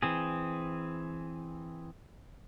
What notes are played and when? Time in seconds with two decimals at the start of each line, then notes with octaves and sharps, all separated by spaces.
0.02 E3 C4 G#4